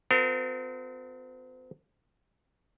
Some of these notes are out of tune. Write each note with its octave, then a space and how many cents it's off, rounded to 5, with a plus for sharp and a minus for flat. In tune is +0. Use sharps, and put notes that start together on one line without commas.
C4 -40 F4 +45 A#4 -35